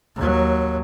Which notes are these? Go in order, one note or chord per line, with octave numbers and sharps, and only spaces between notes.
D#2 F#3